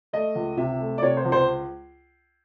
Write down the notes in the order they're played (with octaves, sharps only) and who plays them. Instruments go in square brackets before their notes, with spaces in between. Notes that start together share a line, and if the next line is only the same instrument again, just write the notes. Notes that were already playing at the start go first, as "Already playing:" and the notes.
[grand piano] A3 D#5
C#2
C3 E5
A3
D5
C3 C#5
C5
C#2
C5